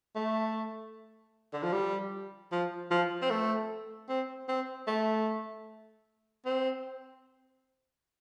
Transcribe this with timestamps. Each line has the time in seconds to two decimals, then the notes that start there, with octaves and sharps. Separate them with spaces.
0.16 A3
1.53 D3
1.63 F3
1.72 G3
2.52 F3
2.91 F3
3.22 C4
3.30 A3
4.09 C4
4.48 C4
4.87 A3
6.46 C4